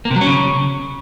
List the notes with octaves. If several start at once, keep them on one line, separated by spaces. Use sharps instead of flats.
A#3
C3
F#3
C#4
C#3